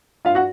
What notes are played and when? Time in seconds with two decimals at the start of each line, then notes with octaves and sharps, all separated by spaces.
0.25 G2 F4 F5
0.35 F#4 F#5